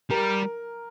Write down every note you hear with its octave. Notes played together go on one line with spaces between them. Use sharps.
G3 A#4